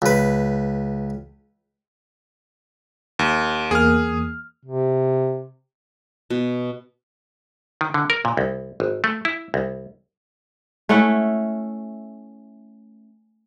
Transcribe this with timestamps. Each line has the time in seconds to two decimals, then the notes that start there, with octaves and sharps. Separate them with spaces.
0.02 C#2 B4
3.19 D#2
3.71 E2 A#3 G#4 D#6 F6
4.65 C3
6.30 B2
7.81 D#3
7.94 D3
8.10 A#4
8.25 A#2
8.37 C2
8.80 G#1
9.04 A3
9.25 E4
9.54 C2
10.89 A3 C#4 E4 F#5